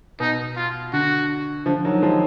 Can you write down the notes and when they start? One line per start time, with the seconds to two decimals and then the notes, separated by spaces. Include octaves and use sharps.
0.20 B2 D#4
0.56 F4
0.93 D3 F#4
1.66 D3 F3
1.85 D#3 F#3
2.02 F3 G#3